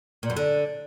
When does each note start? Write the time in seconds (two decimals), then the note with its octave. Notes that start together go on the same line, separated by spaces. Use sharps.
0.23 A#2
0.30 F#2
0.37 D3